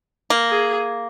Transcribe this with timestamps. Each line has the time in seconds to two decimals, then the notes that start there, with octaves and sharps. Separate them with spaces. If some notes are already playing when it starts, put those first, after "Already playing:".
0.30 A#3
0.50 G#4